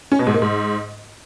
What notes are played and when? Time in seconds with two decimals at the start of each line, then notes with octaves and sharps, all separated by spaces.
0.12 C#4
0.19 B2
0.27 G#2
0.34 A#3
0.42 G#2